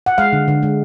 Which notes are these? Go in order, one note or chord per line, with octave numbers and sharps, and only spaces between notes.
F#5
G#3 F5
D3
D3
G#3